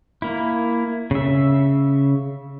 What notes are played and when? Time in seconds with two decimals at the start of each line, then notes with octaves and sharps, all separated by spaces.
0.22 A#3 E4
1.11 C#3 E5